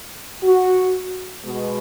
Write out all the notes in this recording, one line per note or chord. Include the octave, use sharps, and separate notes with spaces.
F#4
B2 G#3 B3